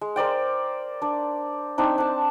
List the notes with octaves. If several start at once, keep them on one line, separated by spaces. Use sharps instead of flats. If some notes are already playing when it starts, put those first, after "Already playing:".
G#3
A#4 C5 D5 G5
D4 D5
C4 D4 D#4
D4 A5